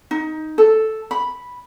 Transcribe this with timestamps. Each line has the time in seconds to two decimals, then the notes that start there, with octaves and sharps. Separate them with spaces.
0.11 D#4
0.58 A4
1.11 B5